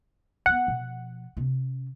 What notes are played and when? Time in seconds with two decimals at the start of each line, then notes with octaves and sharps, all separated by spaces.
0.46 A#3 B3 F#5
0.67 B2 F3
1.37 C3 C#4